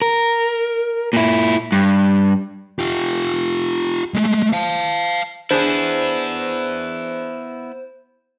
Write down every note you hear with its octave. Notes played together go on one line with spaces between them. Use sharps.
A#4
A#2 E4
G2
F4 G4
G#3 A3
F5 A5
B3 D4 E4 G#4 C5